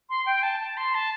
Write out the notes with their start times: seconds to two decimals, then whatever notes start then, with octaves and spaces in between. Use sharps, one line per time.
0.10 C6
0.26 G5
0.43 A5
0.60 A5
0.77 C6
0.94 A5